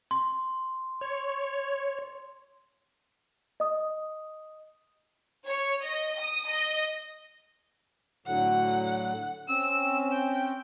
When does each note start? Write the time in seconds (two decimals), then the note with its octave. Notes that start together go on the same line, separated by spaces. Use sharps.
0.11 C6
1.01 C#5
3.60 D#5 D#6
5.45 C#5
5.83 D#5
6.17 D#6
6.48 D#5
8.26 A2 D3 F#3 F#5
9.48 C4 C#4 E6
10.12 G5